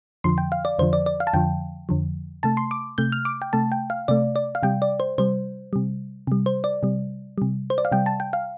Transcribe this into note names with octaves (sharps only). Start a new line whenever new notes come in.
F2 D3 F3 C6
G5
F5
D5
F2 D3 F3 C5
D5
D5
F5
A5
F2 D3 F3 G5
F2 D3 F3
C3 A3 A5
C6
D6
C3 A3 G6
F6
D6
G5
C3 A3 A5
G5
F5
C3 A3 D5
D5
F5
C3 G3 G5
D5
C5
C3 G3 C5
C3 G3
C3 G3
C5
D5
C3 G3
C3 G3
C5
D5
F5
C3 G3 G5
A5
G5
F5